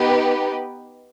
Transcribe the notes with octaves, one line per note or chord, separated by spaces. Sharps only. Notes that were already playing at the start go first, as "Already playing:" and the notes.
Already playing: B3 D#4 G4 B4